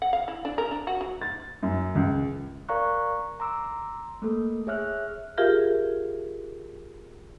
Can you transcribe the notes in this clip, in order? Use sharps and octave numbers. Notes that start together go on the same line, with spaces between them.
F#5
F5
E4
D4
A#4
D4
F#4
F#3
A6
F#2
C#2
A#4 D5 F5 A#5 C#6 F#6
A#5 C6 D6 E6
A3 A#3 A4
G#4 C#5 E5 F6 F#6
F4 G4 G#4 A#4 E5 F5